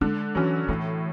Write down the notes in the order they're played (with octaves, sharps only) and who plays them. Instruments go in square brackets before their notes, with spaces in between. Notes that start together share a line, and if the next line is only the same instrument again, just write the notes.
[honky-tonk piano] D3 [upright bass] G#3
[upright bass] E3 [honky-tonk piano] F#3 C#4
[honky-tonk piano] A2 [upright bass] E3